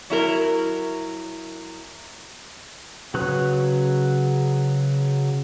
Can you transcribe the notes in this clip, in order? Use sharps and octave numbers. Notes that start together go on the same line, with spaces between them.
F#3 E4 A#4
C#3 F#3 B4 C#6 F#6